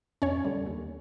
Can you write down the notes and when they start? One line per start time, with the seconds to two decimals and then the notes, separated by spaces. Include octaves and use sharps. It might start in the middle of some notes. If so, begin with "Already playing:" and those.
0.22 F2 C#4 C#5
0.45 D3 G3
0.66 D#2